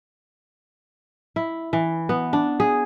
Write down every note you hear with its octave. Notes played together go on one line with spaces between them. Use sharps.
E4
E3
B3
D4
G#4